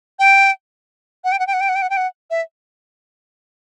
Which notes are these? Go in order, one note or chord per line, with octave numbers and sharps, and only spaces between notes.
G5
F#5
G5
F#5
G5
F#5
G5
F#5
G5
F#5
G5
F#5
E5